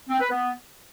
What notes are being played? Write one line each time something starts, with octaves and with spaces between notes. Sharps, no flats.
C4
B4
B3